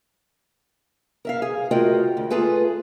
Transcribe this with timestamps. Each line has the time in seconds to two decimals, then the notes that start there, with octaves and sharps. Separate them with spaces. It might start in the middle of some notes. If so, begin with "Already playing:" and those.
1.25 A#4 E5 F5
1.42 G#4
1.71 A3 F4 F#4 A#4 D#5 G5
2.17 D2
2.30 A3 F4 G#4 A4 B4